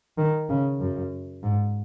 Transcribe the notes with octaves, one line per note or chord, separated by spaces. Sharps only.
D#3
C#3
F#2
G#2